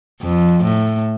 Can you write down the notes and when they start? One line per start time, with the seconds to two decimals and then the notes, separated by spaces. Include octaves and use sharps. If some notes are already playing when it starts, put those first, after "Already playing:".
0.22 F2
0.64 A2